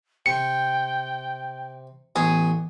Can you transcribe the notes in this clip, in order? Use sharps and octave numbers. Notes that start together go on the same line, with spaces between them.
C3 G5 C#7
A1 B3 G#4